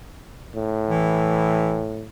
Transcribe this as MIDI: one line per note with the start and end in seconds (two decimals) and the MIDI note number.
0.56 2.06 45
0.90 1.82 52